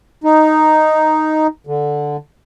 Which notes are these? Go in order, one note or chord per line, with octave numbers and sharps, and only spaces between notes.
D#4
D3